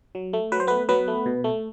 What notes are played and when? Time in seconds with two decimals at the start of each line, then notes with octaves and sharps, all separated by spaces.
0.15 F#3
0.33 A3
0.52 F#3 B4
0.60 C5
0.67 A3 B3 B4
0.89 F#3 B3 B4
1.08 A3
1.26 B2
1.44 A3